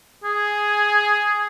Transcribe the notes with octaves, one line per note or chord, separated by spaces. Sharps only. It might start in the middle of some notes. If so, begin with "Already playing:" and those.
G#4